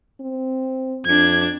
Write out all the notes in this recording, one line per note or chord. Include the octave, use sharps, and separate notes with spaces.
C4
F2 D4 G#6